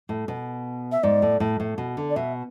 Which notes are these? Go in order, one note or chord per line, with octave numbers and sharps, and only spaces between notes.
A2
B2
E5
G#2 D5
A2
A2
A2
B2
D3
D5
B2 E5